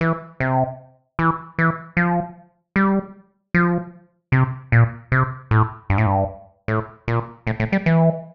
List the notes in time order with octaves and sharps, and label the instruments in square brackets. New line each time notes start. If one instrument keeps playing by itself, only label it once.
[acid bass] E3
C3
E3
E3
F3
G3
F3
C3
A#2
C3
A2
G2
A2
G2
A2
A#2
A2
A2
G3
E3